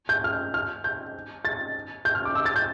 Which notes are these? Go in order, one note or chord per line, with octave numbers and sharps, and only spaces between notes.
G6
F6
F6
G6
A6
G6
F6
D6
E6
A6
G6